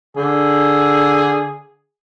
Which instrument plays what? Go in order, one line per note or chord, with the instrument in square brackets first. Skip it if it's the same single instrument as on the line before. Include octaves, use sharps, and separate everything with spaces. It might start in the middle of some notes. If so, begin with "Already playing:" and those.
[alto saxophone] D3 [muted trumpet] G#4